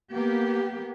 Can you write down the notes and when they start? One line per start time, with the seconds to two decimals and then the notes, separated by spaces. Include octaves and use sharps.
0.14 A#3 B3 G4